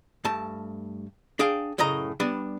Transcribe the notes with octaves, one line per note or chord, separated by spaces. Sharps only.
G2 A3 A5
D4 G#4 F5 G5
F#2 A2 C#3 D#5 A#5
G3 B3 D4